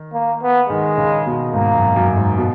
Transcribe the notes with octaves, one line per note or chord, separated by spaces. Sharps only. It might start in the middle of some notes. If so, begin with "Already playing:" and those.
Already playing: D#3
A#3
B3
D#3 G#3
C#3
B2
G#2 A#3
F#2
F#2
G#2
B2